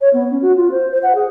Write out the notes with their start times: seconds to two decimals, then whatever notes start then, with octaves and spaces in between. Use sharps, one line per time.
0.01 C#5
0.13 B3
0.31 C#4
0.42 F#4
0.56 F4
0.71 C5
0.91 C5
1.03 F#5
1.15 G#4